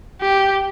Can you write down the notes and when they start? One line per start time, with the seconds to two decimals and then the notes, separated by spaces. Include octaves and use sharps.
0.21 G4